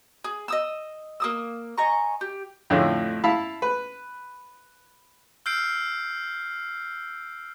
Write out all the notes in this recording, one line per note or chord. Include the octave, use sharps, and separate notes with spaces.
G#4
D#5 D#6 E6
A#3 D#6 E6
D#5 G#5 A#5 C#6
G4
F2 A2 D3 A3 C#4
E4 F5 A5 B5
B4
E6 F6 G6 C7 D7